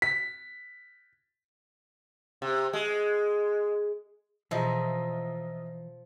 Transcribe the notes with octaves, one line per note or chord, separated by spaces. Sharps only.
B6
C3
G#3
B2 E3 F3 F4 G#4 D#5 E5 A#5